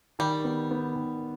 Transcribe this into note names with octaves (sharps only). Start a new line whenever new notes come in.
D#3 G3
B3
B3
D#3